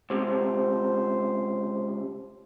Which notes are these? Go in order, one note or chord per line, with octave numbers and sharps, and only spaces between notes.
C#2 C3 C5